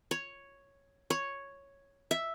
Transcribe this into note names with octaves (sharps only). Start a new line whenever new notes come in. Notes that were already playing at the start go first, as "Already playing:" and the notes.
C#5
C#5
E5